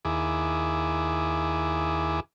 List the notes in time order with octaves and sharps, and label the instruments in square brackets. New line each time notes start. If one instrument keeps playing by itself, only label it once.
[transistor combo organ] D#2 E4 G#4 D6